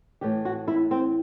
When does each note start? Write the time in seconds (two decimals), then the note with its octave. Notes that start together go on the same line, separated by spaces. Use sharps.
0.21 A2 E3 G4
0.45 F#4
0.68 E4
0.91 C4